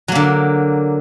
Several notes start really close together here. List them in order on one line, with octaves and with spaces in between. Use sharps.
F#3 A#3 D3